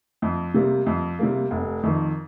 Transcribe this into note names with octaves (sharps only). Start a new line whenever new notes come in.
F2
C3 G3 A#3
F2
C3 G3 A#3
F1
F2 D#3